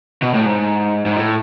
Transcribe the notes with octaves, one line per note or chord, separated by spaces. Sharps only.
B2
A2
G#2
G#2
A2